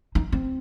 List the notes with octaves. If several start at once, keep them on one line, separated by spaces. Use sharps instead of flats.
D#4
C4